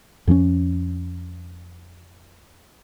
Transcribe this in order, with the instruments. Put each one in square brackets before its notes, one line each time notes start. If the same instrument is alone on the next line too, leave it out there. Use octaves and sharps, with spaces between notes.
[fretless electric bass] F2 F3 C4 C#4